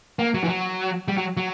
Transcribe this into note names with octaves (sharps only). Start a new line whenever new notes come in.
A#3
F#3
E3
F#3
G3
F#3
F#3